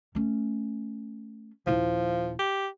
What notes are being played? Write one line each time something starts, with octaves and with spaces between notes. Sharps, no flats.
A3 C#4
D#1 F3 E4
G4